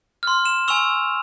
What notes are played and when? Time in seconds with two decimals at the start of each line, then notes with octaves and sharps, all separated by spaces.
0.23 C6 F6
0.45 E7
0.68 G#5 C#6 E6 F7